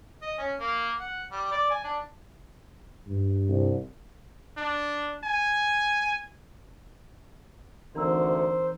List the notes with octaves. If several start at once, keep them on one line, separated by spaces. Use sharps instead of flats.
D#5
C#4
A#3
F#5
G3
D5
G#5
D4
G2
C2
D4
G#5
D2 E3 C4 D#4 A#4 C5 A#5 E6